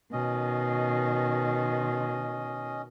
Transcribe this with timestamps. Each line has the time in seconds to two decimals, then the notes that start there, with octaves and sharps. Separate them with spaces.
0.12 B2 D#3 C#4 D#5